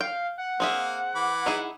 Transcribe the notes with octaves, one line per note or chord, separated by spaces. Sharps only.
F5 G5
F#5
A#3 C4 G#4 E5 F5
E3 B5 D6
D#4 E4 G#4